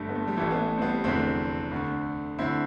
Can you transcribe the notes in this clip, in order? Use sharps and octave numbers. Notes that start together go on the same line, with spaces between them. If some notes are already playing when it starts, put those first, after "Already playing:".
Already playing: G1 G2 D3 G3 A3
B3
A3
G3
A1 A2 E3 A3
B3
A3
C4
G3 B3
F1 E2 D3 A3 C4
D2 D3
D2 D3 C4 E4